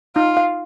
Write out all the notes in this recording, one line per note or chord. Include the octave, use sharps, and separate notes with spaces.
D#4 F4
F5